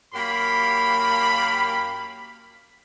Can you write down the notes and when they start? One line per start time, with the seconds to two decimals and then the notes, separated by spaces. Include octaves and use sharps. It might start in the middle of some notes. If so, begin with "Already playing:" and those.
0.14 F#2 A#3 G4 F5 B5